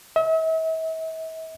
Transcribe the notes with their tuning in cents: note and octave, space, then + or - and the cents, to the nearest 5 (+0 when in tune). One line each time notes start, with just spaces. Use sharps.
E5 -40